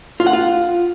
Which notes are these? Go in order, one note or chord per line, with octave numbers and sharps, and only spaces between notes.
F4
F#5
F4